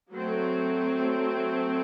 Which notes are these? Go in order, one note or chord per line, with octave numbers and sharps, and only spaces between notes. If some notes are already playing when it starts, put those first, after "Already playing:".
F#3 A3 C4